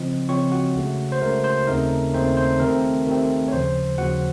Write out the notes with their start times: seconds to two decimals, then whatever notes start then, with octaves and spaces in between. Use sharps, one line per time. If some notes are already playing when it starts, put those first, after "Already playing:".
Already playing: C#3 F3 C4 F4 D#5
0.28 C#3 F3 C4 F4 C#5 C#6
0.52 F#4 F#5
0.75 C#2 C#3 A3
1.12 C5
1.21 C#2 C#3 A3 A#4
1.44 C5
1.67 D#2 C#3 A3 C4 D#4 A#4
2.13 D#2 C#3 A3 C4 D#4 C5
2.37 C5
2.59 C3 D#3 A3 C4 A#4
3.07 C3 D#3 A3 C4
3.48 C#5
3.52 D#2 C#3 F3 C5
3.98 D#2 C#3 F3 F#4 F#5